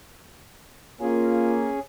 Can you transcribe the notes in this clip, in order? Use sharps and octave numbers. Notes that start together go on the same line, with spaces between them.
A#3 C#4 F4 G#4